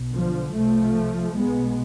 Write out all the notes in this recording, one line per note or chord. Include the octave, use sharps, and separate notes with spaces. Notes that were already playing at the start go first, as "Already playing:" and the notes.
Already playing: B1 B2
D3 F3
C2 C3 F3 A3
B1 B2 G#3 B3